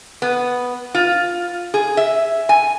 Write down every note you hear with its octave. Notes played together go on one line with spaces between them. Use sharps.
B3
F4
G#4
E5
G#5